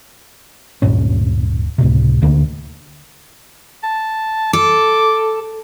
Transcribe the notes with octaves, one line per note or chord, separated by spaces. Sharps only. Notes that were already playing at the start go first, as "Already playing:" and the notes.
D1 G2 A#2 C#4
C#2 A2 C3
D2 D3 A#3
A5
A4 D6